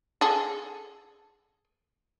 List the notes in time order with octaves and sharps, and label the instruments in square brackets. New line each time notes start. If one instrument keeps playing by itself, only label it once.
[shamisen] G#4 A4